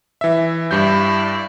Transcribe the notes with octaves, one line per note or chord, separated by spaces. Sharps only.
E3 E5
G2 G3 E4 D5 G6